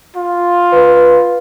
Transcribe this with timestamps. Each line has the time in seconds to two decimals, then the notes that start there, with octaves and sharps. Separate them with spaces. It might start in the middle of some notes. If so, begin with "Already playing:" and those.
0.16 F4
0.73 B4